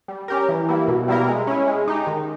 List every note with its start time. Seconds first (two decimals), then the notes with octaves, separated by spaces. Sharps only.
0.08 G3
0.28 C#4 G4 A#4
0.49 E3
0.68 G3 A#3 E4
0.88 B2
1.08 G3 A#3 E4 A#4
1.28 G#3
1.47 C#4 E4
1.68 G#3
1.88 D#4 G4
2.07 D#3